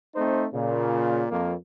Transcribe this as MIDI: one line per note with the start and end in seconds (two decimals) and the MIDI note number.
0.16 0.46 57
0.16 0.46 60
0.16 0.46 63
0.16 0.46 72
0.54 1.25 46
0.54 1.25 49
1.30 1.53 41
1.30 1.53 58